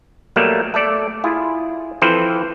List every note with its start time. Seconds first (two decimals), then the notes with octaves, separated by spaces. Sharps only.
0.36 B2 F#3 G3 A3 A#3
0.74 A3 A4 D5
1.24 E4 F4 G#4
2.02 E3 F3 C4 A4 B4 C5